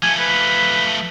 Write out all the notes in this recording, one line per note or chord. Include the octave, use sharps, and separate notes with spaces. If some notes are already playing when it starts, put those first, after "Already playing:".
F3 A3 G#5
B4